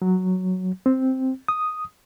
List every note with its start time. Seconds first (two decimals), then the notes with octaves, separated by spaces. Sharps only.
0.02 F#3
0.86 C4
1.48 D#6